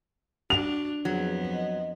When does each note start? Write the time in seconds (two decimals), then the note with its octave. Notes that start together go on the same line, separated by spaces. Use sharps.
0.50 D4 F#4 F7
1.05 F2 F#3 B3 G#4
1.53 D#5